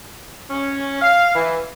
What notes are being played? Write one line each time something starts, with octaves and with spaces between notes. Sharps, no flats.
C#4
F5
E3